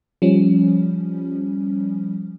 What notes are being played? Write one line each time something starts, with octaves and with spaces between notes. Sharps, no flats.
F3 G3 C#4